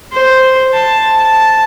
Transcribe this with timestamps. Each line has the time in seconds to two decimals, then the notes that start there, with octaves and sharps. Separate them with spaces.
0.12 C5
0.73 A5
1.15 A5